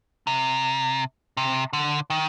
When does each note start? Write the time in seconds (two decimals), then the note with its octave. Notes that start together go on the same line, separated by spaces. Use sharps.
0.27 C3
1.37 C3
1.73 D3
2.10 D#3